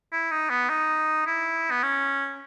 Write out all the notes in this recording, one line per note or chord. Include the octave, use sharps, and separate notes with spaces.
E4
D#4
B3
D#4
E4
B3
C#4